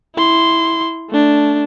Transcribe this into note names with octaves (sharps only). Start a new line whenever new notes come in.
E4 C6
A3 D4